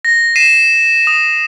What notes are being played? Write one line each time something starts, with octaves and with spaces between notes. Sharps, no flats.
A#6
C7 D#7 E7
D#6